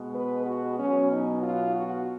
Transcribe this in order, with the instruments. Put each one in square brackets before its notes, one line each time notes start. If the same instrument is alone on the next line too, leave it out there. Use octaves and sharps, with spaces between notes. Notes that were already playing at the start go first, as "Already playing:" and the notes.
Already playing: [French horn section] B2 G#3 B3
B4
F#4
B2 F#3 B3 C#4
D#4
F4
F#4